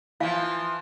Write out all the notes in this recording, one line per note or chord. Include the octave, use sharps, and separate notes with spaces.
E3 F3 E4 F5